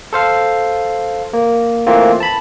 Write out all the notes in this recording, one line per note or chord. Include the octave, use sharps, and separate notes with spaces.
A4 C5 F5
A#3
E3 A3 A#3 C4 F4
A5 B5